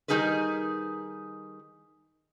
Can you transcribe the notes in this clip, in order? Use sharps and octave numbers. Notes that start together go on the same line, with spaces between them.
D#3 G3 D#4 G#4 A#4 B4